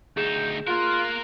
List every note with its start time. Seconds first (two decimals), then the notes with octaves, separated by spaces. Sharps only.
0.17 D2 D#4 G#4 G6 E7
0.67 A#3 F4 A#4 F#6